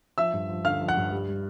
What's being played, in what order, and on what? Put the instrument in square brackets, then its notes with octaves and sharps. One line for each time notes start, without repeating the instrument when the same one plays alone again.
[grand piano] F3 E5 E6
G2
F3
D3 F5 F6
F3
F#5 F#6
G2
G3
G3